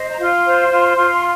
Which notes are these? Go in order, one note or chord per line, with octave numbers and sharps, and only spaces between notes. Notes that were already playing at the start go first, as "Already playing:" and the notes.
Already playing: C5 D#5
A#5
F4 C6
C5
F4
F4